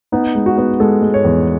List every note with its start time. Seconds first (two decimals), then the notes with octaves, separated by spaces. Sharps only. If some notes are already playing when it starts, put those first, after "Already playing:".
0.12 B3 D#4
0.35 G#3
0.46 F#4
0.58 B3
0.80 G#3 A4
1.02 G#3
1.14 C#5
1.25 E2